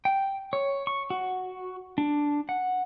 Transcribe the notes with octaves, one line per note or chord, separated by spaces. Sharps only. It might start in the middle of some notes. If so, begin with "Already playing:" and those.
G5
C#5
C#6
F#4
D4
F#5